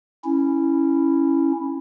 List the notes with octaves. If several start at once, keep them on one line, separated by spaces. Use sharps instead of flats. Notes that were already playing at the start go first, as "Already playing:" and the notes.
C#4 E4